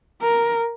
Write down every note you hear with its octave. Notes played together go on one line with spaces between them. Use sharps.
A#4